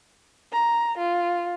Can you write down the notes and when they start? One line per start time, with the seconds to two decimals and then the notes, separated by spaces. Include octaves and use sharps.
0.53 A#5
0.98 F4